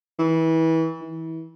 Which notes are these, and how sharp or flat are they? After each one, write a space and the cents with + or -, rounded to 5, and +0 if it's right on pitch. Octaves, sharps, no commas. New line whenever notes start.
E3 -25
E3 -30